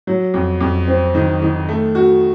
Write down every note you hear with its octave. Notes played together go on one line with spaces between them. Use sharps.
F#3
F2
F2
C4
D#3
D#3
A3
F#4